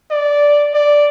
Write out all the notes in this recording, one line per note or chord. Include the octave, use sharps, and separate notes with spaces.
D5
D5